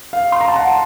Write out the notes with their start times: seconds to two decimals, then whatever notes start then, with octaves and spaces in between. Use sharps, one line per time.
0.13 F5
0.32 C6
0.41 A#5
0.48 A5
0.56 F#5